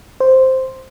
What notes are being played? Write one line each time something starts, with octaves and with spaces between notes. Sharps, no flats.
C5